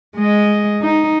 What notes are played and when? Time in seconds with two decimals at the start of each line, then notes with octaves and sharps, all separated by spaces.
0.17 G#3 D#5
0.82 D#4